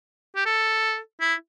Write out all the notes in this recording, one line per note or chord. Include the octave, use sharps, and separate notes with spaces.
G4
A4
E4